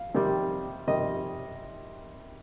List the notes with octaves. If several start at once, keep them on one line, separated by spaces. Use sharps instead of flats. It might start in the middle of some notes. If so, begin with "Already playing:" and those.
Already playing: F5
C3 D#3 G3
C3 D#3 G3 D#5